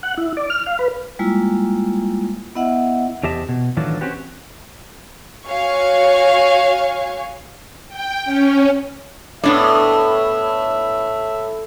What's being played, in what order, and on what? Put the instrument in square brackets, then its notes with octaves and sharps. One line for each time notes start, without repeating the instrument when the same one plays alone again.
[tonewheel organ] F#5
E4
D5
F6
F5
B4
[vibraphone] G3 G#3 A#3 E4 F4
B3 E4 D#5 E5 F#5
[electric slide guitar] E2 C3 G4 D#5 E5 A5
B2
A2 D#3 E3 F#3 D4 F4
C4 C#4 F#4 G4 B4
[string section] F#4 C#5 F5 G#5 C#6
[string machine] G5
C#4
[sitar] A2 [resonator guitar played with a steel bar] B3 D4 D5 [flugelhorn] E5